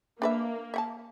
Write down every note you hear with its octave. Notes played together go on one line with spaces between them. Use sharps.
A#3 D4 B4 E5
E5 F#5 A5